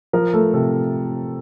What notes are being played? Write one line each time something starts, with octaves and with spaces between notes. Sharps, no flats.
F3 A#4
A3 A4
C3 A4